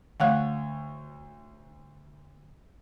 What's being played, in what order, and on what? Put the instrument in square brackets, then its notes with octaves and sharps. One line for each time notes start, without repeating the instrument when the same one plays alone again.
[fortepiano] D2 C#5 [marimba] F5 F#5 F#6